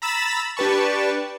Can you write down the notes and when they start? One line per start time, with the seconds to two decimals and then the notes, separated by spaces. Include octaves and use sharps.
0.02 A#5 B5 E6 A6 B6 E7
0.57 D4 G4 B4 A5 C#6